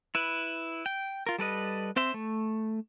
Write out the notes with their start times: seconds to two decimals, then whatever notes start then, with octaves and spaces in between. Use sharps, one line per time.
0.15 E4 B4
0.86 G5
1.27 F4 A#4
1.38 G3 A4 B4 D#5
1.96 C4 C5 E5 C6
2.14 A3